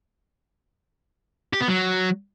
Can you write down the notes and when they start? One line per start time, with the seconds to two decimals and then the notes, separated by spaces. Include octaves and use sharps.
1.53 G4
1.61 B3
1.68 F#3